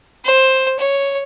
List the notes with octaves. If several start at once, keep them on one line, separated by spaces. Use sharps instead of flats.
C5
C#5